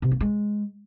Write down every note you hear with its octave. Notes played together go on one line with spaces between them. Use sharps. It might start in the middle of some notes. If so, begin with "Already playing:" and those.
C3
A#3
G#3